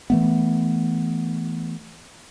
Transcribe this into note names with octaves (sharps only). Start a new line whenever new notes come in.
E3 A3 B3